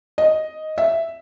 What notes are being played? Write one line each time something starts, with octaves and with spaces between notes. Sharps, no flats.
D#5
E5